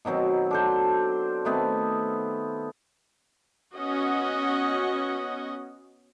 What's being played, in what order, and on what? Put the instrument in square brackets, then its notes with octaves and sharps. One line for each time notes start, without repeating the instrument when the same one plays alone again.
[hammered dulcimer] B2 D#3 F#3 C4
D4 A4 C5
D#3 A3 B3 C4
[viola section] B3 C#4 F#4 D#5 F#5